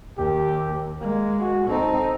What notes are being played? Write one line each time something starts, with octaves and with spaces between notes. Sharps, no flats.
D#2 G4
G#3 A#3
F#4
C4 D#4 A4